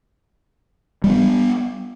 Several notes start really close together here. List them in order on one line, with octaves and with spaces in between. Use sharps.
G3 G#3 B3